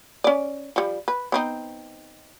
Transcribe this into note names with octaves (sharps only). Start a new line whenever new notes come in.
C#4 D5
F3 G3
B4
B3 C4 D#4